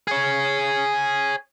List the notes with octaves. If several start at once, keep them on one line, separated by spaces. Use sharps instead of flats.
G#4 C#5